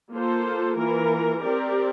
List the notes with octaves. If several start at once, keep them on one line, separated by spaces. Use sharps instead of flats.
A#3 F4 A4 C5
E3 A#3 F4 A#4
C4 G4 A#4 D5